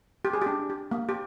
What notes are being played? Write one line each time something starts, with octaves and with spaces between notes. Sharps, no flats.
G4
G#4
D4 G4
G4
A#3
G4